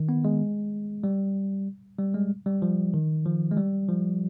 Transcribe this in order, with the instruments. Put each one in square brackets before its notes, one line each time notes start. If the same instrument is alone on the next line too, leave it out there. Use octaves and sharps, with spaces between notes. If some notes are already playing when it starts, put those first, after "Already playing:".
Already playing: [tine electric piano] D#3
B3
G#3
G3
G3
G#3
G3
F3
D#3
F3
G#3
G3
F3